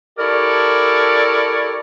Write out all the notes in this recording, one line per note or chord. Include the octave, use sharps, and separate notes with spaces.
E4 G4 A4 A#4 C#5 D5